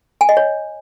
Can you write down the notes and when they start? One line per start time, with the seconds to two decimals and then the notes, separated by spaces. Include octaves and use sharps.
0.21 G#5
0.29 D#5
0.37 C#5